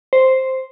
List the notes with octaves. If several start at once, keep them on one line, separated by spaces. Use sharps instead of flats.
C5